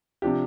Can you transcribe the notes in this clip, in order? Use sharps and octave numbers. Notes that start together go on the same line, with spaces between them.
C3 F3 D4 G4